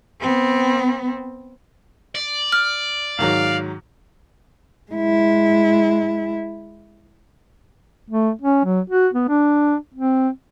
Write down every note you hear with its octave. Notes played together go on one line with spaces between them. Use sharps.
B3 C4
D5
F6
G#2 D#3 F#3 F5
G#3 E4
A3
C#4
F#3
F#4
B3
D4
C4